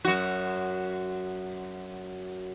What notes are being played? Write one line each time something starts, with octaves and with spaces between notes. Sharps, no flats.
F#2 F#4